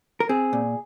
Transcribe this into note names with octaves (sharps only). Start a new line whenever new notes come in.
A#4
C4 G#4
A#2